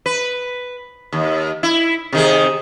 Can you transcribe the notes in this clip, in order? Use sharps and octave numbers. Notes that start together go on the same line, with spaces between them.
B4
D#2
E4
C3 D#3 G#4